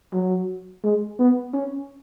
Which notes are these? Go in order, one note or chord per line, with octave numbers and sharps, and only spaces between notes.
F#3
G#3
B3
C#4